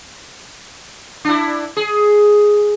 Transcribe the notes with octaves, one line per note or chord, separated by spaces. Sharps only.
D4 E4
G#4